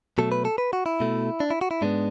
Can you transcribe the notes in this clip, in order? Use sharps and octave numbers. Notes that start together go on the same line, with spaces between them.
B2 F#3 A3 A4
B4
A4
B4
F#4
E4
B2 A3
D4
E4
F#4
E4
G#2 G#3 B3 D4